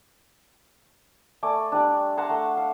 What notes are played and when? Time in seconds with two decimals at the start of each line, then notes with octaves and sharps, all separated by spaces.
1.43 A3 D5 G#5
1.72 G3 D4
2.17 F#5 A5 A#5 C6
2.30 A3
2.57 F5